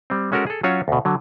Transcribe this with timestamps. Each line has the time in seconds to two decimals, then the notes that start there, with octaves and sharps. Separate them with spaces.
0.10 G3 C4
0.32 G#3 C#4 F#4 A4 A#4
0.47 G#4 A4
0.63 F#3 C#4 F4 F#4 C#5
0.88 D2 B2
1.05 D3 F#3